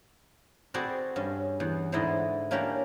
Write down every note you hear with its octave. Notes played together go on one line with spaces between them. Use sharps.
C4 F#4 G#4 A4 B4 D5
G2 C#4
E2 B3
E2 G#2 D3 E4 D5 D#5
A#3 C#4 D4 G4 A#4 F#5